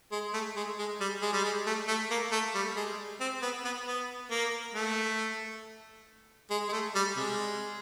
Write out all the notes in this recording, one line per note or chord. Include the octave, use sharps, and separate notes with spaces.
G#3
A3
G#3
G#3
G3
G#3
G3
G#3
A3
A3
A#3
A3
G3
G#3
C4
B3
B3
B3
A#3
A3
G#3
G#3
A3
G3
C3 G#3